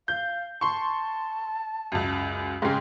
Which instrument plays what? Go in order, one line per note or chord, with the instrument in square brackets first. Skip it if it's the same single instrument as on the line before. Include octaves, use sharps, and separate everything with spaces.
[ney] F5 [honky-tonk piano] G6
[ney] A5 [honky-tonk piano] C6 C#6
[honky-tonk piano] C#2 F#2
[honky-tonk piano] G#2 C#3 [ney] G5